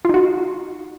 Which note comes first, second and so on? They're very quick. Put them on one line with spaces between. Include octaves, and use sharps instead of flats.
F4 D#4 F#4